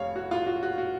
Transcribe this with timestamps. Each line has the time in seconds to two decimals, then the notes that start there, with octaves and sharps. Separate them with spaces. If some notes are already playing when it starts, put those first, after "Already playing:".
Already playing: F1 C#5 F5
0.16 F#4
0.31 F4
0.46 F#4
0.63 F#4
0.78 F#4